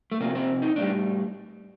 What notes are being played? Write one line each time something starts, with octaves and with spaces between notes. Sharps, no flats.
A3
C3 F3 A#3
C4
D#4
A2 G3 D4